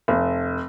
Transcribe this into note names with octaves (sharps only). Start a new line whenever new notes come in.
F1